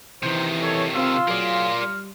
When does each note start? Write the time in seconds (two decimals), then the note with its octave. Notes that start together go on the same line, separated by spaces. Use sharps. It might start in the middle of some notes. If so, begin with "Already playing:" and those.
0.23 C3 D#3 E3 C5
0.62 A4 C#5
0.95 C4 F4 F5 C6 E6
1.28 F#3 G#4 A#4 D5
1.81 G3 F6